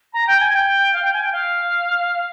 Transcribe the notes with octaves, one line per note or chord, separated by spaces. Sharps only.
A#5
G5
G#5
G5
F5
G5
G#5
G5
F5